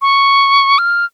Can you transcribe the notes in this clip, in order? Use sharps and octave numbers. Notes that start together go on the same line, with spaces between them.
C#6
F6